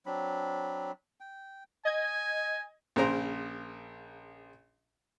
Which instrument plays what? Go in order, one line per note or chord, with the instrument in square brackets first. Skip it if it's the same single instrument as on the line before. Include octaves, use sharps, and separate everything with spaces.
[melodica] F#3 C4 D4 B5
G5
[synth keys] D#5 G#6 [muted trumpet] G#5
[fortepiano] A#1 C#3 A#4 C5 A#5